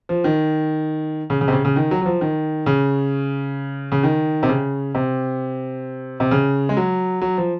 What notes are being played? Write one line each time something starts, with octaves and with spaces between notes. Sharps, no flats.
F3
D#3
C#3
C#3
C3
C#3
C#3
D#3
F#3
F#3
F3
D#3
C#3
C#3
D#3
C3
C#3
C3
C3
C#3
G#3
F#3
F#3
F3